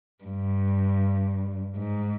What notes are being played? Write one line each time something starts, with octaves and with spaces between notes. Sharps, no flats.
G2
G#2